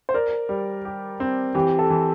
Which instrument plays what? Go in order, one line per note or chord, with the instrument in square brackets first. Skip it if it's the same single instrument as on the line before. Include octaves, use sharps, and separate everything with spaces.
[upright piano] C5
[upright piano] A#4 [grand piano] D5
[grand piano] G3
G4
C4
[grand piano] E3 [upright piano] G4
[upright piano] A4
[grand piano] E3